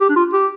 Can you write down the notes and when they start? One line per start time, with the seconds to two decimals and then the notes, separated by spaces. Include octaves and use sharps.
0.01 G4
0.09 D4
0.16 F4
0.33 G4